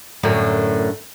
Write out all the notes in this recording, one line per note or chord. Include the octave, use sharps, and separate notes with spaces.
F#2 A2 D3